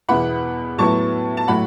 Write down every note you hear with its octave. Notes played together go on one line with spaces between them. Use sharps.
E2 B2 B3 E4 F#5 B5
A2 F#3 B3 E4 A5 C#6
A5
A2 F#3 A3 E4 F#5 B5